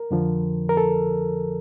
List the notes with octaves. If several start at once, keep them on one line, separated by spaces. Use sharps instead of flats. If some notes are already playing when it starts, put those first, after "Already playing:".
Already playing: A#4
F2 D3 F3
A#4
A4